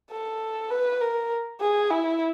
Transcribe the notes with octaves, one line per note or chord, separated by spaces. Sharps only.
A4
B4
A#4
G#4
E4